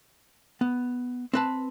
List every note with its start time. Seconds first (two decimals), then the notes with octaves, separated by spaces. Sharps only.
0.61 B3
1.33 C4 B4 A5